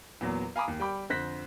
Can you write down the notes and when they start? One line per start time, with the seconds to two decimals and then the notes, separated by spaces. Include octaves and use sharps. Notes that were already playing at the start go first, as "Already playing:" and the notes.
0.21 E2 A#2 F#3
0.56 F5 G#5 A#5 B5 D6 D#6
0.68 D#2
0.80 G3 G5 B5 D6
1.10 F2 D3 C5 F#6 A#6 B6